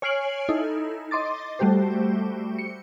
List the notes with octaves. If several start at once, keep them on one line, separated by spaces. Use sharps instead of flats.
C#5 G#5 F6 C7 D7 F#7
D#4 E4 A4
D#5 C6 D6 A6
G3 A3 F#4 G4 C5
C#7